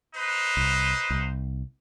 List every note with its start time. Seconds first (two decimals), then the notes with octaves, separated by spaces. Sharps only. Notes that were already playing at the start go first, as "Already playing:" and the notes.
0.15 D#4 B4 C5
0.57 C2
1.10 C2